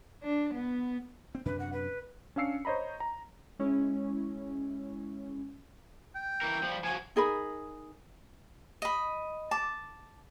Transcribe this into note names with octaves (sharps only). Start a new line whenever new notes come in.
D4
B3
C4
F#2 C3 D4 B4
F#5
B4
C#4 D4 F5 E6 C7 C#7
C5 C#5 D#5 A#5 B5
A#5
G#3 C#4 E4
G5
E3 A#4
F3 G3
F3 F#4 G#5
D#4 G#4 A#4 B5
D#5 B5
A5 D6